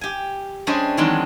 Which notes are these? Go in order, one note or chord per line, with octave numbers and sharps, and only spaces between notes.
G4 G#5
G3 C#4 D4 G#4 C5 D#5
D#3 E3 F#3 G#3 C4 D4